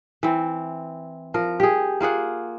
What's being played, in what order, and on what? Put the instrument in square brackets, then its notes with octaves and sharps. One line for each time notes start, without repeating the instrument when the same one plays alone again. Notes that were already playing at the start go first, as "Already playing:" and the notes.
[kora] E3 C4
F3 A#4
G4 G#4
A#3 F4 G#4 F#5